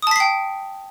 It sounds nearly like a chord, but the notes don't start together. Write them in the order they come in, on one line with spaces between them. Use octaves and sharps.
D#6 A5 B6 C7 G5